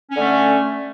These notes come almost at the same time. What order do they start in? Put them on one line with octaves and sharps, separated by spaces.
C#4 D3 A3